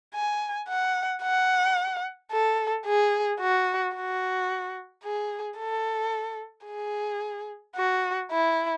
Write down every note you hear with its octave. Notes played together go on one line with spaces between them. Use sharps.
G#5
F#5
F#5
A4
G#4
F#4
F#4
G#4
A4
G#4
F#4
E4